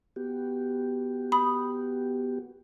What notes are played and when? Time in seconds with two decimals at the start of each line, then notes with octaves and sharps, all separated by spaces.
0.16 B3 F#4 G4
1.32 B5 D#6